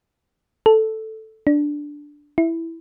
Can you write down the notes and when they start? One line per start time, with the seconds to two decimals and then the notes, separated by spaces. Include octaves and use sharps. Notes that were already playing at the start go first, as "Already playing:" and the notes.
0.66 A4
1.47 D4
2.38 E4